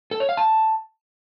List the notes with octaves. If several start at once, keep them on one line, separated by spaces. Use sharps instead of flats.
A4
C#5
F5
A5